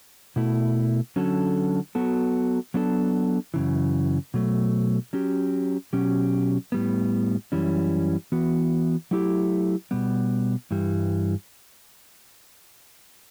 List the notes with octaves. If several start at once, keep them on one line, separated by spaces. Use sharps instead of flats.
B2 A3 E4
D3 F#3 C#4 F#4 A4
F#3 B3 F#4 A4
F#3 B3 D4 A4
F#2 C#3 E3
B2 F#3 A3
F#3 C#4 G4
B2 F#3 C#4 G4
A2 G3 B3
F#2 E3 G3 C#4
E3 B3 F#4
F#3 A3 E4 G4
B2 G3 B3
G2 E3 G3